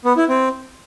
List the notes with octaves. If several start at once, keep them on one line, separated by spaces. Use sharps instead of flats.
B3
E4
C4